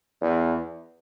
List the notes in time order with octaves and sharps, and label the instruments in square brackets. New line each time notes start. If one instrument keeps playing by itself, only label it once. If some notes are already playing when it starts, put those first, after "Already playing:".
[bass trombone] E2